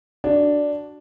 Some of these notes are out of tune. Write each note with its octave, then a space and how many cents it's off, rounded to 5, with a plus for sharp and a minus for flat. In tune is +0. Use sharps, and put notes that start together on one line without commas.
D4 +0 F#4 +10 D5 +0